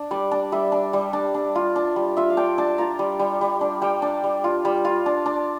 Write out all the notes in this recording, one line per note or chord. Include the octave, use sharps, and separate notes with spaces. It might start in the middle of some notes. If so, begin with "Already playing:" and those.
Already playing: D4
G3 D5
D4
G3 E5
D4
G3
D4
D4
F4
D4
G3
F4 E5
F5
D4 G5
D4 A5
F4 A#5
G3
G3
G3
D4
G3 G5
D4
G3
F4
G3
F4
D4
D4